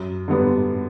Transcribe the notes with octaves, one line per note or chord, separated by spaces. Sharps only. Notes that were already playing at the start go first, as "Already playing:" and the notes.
Already playing: F#2
D3 G3 B3 D4